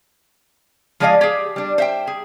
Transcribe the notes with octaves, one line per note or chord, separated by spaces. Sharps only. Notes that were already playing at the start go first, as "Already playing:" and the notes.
F3 G#3 G#4 D5 D#5 F5
G4 G#4
G3 D4
C5 E5 G5
G#4